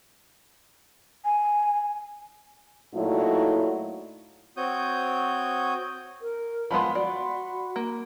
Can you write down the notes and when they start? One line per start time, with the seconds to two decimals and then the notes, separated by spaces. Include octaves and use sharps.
1.25 G#5
2.94 A#2 F#3 A3 D#4 E4 F#4
4.57 C4 F#4 C#5 D#6 G6
6.20 A#4
6.71 F3 G#3 B3 F5 B5 C6
6.95 F#4 D5
7.76 A#3